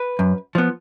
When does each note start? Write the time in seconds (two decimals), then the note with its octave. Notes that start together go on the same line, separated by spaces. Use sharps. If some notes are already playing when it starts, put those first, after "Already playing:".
Already playing: B4
0.19 F#2
0.55 F3 B3